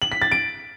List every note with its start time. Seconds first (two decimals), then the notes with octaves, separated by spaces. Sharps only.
0.02 F#7
0.12 B6
0.22 A6
0.32 D7